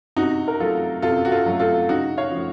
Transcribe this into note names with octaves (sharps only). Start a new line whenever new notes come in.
C3 D#4 F#4
A#4
F#3 A3 F4 A4
C3 F4 A4
F#4
F4 A4
F#3 A3
F4 A4
C#3 D#4 F#4
C#5 F5
F3 A3